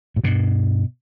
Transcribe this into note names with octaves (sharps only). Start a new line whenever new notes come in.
A2
G2 B2